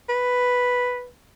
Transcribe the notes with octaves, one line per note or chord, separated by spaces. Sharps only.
B4